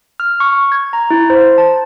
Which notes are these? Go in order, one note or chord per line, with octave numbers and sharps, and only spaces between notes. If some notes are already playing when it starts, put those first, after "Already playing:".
F6
C#6
G#6
A#5
E4
C5
A5